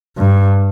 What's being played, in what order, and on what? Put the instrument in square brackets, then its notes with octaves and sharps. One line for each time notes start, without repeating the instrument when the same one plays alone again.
[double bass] G2